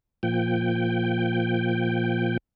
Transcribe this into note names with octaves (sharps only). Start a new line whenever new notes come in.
A#2 F3 G5